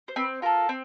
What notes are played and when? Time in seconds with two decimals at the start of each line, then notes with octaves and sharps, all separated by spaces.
0.08 C5
0.16 C4 B4
0.42 F4 A4 A#4
0.69 C4